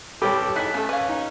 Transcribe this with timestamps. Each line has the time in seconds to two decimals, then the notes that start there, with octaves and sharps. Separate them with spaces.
0.22 C2 G4 A4 B4 C#5 G5 D6
0.56 D#4 E4 G#4 F#6 B6
0.74 A3 C#4 D#4 A4
0.89 C#4 B4 F5
1.09 D#4